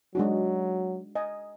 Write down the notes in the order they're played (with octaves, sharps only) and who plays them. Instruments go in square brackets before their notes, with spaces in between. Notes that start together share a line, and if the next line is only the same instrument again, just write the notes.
[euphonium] F#3 [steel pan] G#3 D4 F#4
[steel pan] D#5 G#5